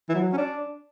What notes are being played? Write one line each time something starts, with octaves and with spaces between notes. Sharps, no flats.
E3
F#3
C#4
D4